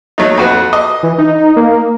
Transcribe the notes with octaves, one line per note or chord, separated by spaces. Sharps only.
F#3 A3 D#4
F2 F#4 B4
D#5
E3
D#4
A#3